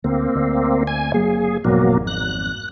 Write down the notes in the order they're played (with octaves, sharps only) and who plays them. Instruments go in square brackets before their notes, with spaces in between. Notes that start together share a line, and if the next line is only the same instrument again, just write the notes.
[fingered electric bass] D2 [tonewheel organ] A#3 C4
[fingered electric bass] D2
[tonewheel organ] G#5
[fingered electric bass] F#1 F#3 A#3 [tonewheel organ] G#4
[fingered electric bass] G#1 F2 [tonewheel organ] B2 F#3 A#3
[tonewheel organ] F#6